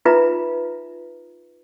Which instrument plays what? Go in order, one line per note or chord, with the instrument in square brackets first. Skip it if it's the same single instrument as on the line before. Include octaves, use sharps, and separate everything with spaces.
[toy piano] D#4 F4 B4 E5 A#5